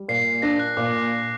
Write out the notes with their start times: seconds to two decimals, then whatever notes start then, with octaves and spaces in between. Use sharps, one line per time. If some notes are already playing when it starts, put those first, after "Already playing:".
Already playing: G3
0.08 A#2 C7
0.42 D4 A#6
0.59 F#6
0.77 A#2 D6